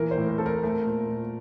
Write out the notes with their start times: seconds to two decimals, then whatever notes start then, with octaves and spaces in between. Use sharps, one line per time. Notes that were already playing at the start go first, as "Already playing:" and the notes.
Already playing: A#2 E3 A#4
0.11 C5
0.17 A2
0.28 A#4
0.38 C4 A4
0.46 A#4
0.63 A3
0.86 A#2
1.09 A#2